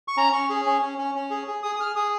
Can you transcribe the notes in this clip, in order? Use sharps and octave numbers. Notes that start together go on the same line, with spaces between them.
C#6
C#4 A#5
C#4 C#6
G#4
C#4
C#4
C#4
C#4
G#4
G#4
G#4 D#6
D#6
G#4 F6
G#4 D#6